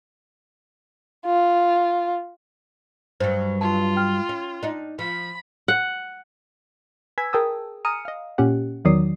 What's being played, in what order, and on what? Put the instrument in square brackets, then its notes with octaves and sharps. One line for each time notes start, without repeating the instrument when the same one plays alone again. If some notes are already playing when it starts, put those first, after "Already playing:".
[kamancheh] F4
[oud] G2 F#3 [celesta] C5
[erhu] F4 [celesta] A5
[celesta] G5 F6
[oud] C#4
D4 D#4
[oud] F3 [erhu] B5
[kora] F#5
[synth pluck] B4 G#5 E6 G#6 B6
G#4 A#4 G5 A5 D#6 E6
G#5 A#5 D#6 F6 C#7 D#7
D#5 F5
A#2 C#4 G4 F#5
E2 D#3 F#3 D5 D#6 C7